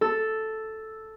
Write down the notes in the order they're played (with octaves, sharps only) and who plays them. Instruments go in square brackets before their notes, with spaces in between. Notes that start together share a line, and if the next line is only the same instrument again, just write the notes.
[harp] A4